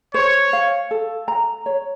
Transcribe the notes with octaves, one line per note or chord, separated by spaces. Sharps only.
C5 C#5
F5
A4
A#5
C#5